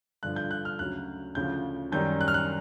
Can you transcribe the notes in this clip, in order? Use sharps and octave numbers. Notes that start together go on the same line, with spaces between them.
G2 D3 F3 F#6
G6
F#6
F6
D2 C#3 F#3 F#6
D2 C#3 F3 G6
F#2 D#3 G3 G6
F#6
F6
F#6